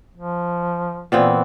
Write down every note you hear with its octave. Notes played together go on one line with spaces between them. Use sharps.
F3
A#2 E3 B3 C4